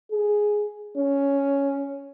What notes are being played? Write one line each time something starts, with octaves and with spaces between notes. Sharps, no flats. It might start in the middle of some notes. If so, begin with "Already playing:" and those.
G#4
C#4